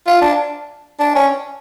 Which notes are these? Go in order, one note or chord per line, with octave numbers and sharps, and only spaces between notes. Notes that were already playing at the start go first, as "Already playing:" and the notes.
F4
D4
D4
C#4